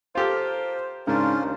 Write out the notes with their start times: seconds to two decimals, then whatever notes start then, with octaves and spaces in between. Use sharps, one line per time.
0.15 F4 G4 A4 A#4 C5
1.07 G#2 C#3 C#4 D4 F4 A#4 C5
1.43 D#2